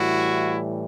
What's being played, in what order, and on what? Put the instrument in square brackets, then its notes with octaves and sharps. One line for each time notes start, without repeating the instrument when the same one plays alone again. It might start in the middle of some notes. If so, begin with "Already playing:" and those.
Already playing: [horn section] A2 E3 G3 E4 F#4